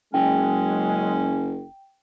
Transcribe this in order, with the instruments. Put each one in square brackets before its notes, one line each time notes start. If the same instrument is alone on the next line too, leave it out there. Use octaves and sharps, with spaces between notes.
[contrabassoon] F#1 [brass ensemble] F#3 G#3 [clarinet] C#4 [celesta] G5